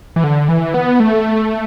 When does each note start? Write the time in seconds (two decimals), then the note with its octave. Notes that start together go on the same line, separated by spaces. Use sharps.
0.16 E3
0.24 D3
0.49 E3
0.74 B3
1.00 A3